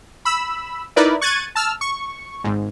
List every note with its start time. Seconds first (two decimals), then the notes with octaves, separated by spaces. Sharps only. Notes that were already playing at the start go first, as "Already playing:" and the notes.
0.25 B5 E6
0.96 D#4 E4 A#4 B4 D5
1.21 C#6 F#6 G#6 A6 D#7
1.55 A5 E6 F6
1.81 C#6
2.44 G#1 G#2